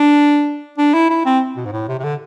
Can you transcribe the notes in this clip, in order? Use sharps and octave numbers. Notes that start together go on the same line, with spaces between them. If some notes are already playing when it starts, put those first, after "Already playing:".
Already playing: D4
D4
E4
E4
C4
B2
G#2
A2
C3
C3
D3